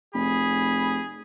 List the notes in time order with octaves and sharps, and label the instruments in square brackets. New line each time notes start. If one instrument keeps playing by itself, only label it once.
[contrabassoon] F1 [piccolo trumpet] G#4 [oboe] B5